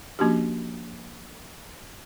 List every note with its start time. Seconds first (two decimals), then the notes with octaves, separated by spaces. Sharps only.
0.19 F3 A#3 C#4 D4 F#4 G4